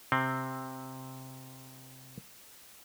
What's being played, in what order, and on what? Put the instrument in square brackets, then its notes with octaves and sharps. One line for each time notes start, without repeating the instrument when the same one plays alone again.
[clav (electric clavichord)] C3 C4